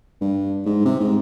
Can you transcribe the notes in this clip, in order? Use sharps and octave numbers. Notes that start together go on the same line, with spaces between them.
G2
G#2
C3
G#2